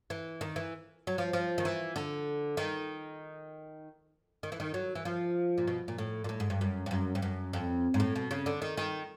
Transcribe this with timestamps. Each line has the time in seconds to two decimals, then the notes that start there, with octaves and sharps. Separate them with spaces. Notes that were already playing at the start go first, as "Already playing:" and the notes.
0.10 E3
0.41 D#3
0.56 E3
1.07 F#3
1.18 F3
1.33 F3
1.58 D#3
1.65 E3
1.96 D3
2.57 D#3
4.43 D#3
4.52 E3
4.60 D#3
4.74 F#3
4.95 E3
5.05 F3
5.58 A#2
5.67 B2
5.88 A#2
5.98 A2
6.24 A#2
6.29 A2
6.40 G#2
6.50 G2
6.61 F#2
6.86 G2
6.91 F#2
7.15 G2
7.22 F#2
7.53 F2
7.94 G#2
8.00 A2
8.16 B2
8.31 C#3
8.46 D3
8.62 D#3
8.77 D#3